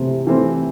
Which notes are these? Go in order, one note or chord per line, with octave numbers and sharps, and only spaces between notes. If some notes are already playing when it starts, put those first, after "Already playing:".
Already playing: C3 E3 A3 C4
E3 A3 C4